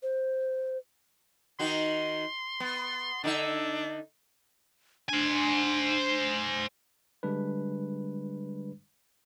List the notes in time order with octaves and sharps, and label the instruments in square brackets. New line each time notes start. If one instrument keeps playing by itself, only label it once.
[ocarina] C5
[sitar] D#3 D#4 F#4 [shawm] C6
[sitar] B3
[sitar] D3 D#4 E5 [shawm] D4
[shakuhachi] D4 [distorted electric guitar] C5 G#5
[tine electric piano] D3 G3 G#3 D4 B4